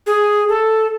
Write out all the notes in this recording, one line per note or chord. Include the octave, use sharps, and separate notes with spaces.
G#4
A4